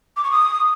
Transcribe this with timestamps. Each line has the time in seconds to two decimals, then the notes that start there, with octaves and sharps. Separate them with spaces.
0.17 D6
0.24 C#6
0.31 D#6